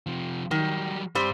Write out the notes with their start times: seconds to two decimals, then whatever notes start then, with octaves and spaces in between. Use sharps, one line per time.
0.06 C3 F3
0.51 D#3 F#3 G3
1.15 G2 G3 C4